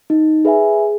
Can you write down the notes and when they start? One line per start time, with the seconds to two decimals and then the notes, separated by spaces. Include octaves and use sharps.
0.10 D#4
0.45 G#4 B4 E5 G#5
0.79 G#4